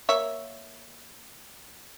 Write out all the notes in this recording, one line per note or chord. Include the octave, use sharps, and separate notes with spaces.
A#3 C#5 E5